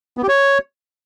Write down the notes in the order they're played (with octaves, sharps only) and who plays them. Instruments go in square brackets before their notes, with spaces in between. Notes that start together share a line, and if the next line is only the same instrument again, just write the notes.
[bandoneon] B3
G4
C#5